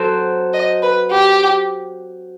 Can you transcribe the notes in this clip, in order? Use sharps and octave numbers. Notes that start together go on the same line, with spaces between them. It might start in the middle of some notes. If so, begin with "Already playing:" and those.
Already playing: F#3 C4 F#4 A4 C5
D#5
B4
G4